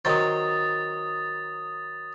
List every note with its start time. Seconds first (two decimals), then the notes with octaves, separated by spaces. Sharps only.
0.05 D#3 F#3 C5 D#6 A6